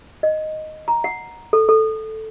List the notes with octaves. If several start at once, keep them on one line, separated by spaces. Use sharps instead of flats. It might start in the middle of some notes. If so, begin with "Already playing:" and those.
D#5
A#5
F#5
A4
A4